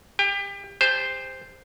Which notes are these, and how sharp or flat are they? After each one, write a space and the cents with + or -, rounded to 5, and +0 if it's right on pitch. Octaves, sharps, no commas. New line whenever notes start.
G4 +30 G5 +30
G4 +40 C5 -5 A5 +0